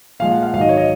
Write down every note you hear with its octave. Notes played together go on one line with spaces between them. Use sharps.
A#2 F3 G#3 F5
F#5
F5
G#2 D#3 F#3 F5
D#5
C#5
D#5